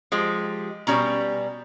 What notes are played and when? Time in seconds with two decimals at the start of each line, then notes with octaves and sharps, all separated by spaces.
0.12 F3 G#3 G4
0.87 B2 G3 C#4 A#5